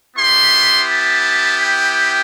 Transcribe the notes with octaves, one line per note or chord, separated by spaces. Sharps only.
B3 E4 G4 C6
A5
G5